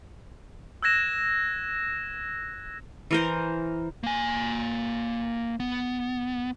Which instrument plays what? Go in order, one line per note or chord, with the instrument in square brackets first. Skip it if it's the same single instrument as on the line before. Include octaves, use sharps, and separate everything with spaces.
[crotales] E6 F#6 G#6 A#6 E7
[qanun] E3 A#4 C5
[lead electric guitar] A#3 G#5
B3